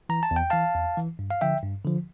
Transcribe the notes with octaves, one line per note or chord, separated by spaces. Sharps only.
E3 A#5
A5
E2
G5
E3 F5 A5
E2
E3
G2
F5
D3 F3 E5 G5
G2
D3 F3